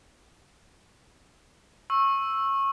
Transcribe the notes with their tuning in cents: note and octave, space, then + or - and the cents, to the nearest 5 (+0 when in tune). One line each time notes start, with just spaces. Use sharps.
C#6 -20 E6 +0